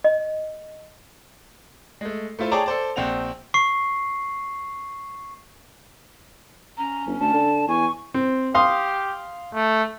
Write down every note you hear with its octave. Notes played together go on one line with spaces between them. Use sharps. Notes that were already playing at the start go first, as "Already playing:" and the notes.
D#5
G#3 A3
A3 E4 F4 C5
G#4 C#5 D5 G5 A5 A#5
A4 C5 D5
A#1 C4 F#5 F7
C#6 C7
C#4 A#5
G1
D2 A5
D3
E2 G#5 C#6
C4
G4 F5 C6 D#6
A3